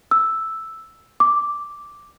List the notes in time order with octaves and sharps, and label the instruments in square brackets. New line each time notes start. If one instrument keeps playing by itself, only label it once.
[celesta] E6
D6